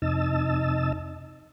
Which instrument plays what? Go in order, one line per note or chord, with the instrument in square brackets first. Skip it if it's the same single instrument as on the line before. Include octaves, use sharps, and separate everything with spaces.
[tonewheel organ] F2 C3 D#4 D#5 A5 E6